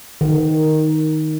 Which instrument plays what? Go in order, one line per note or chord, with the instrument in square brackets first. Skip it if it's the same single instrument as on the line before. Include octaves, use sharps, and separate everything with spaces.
[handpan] D#3